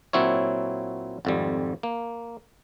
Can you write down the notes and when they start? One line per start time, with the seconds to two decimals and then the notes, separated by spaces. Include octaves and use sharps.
0.13 A#2 F#3 C4 E4 C#5
1.25 G#1 F2 G3
1.83 A#3